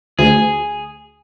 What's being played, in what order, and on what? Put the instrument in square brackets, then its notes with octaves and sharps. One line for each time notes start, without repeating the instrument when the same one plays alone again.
[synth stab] D2 [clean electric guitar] G#4